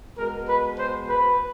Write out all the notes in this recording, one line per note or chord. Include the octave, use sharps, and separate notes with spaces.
B2 G#3 A#4
B4
C5
B4